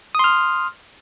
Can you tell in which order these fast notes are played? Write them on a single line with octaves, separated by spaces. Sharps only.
D#6 C6 F6